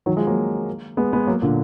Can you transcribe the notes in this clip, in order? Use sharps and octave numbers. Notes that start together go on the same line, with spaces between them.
D#3 F#3
F3 G#3
F#3 A#3
G#3 B3
G#3 B3
F#3 A#3
A#2 D3